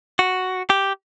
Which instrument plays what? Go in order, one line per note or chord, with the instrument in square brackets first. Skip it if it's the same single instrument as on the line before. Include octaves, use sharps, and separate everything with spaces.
[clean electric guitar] F#4
G4